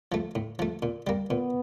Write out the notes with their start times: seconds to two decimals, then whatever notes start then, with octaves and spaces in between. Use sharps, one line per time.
0.12 F3 A3
0.35 A2
0.59 F3 A3
0.83 A#2
1.07 G3 A#3
1.30 A#2 B3